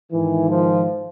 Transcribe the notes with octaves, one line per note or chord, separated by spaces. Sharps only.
G#2 D#3 E3
F3